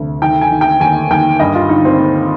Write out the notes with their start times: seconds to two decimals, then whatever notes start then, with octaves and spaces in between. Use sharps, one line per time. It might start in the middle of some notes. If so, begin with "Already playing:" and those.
Already playing: D2 C3
0.22 D#3 G5
0.41 G#5
0.51 D#3
0.61 G5
0.80 D#2 G#5
1.11 D#2 G5
1.40 G2 D#5
1.55 F4
1.69 D3 D#4
1.85 C4
1.99 D3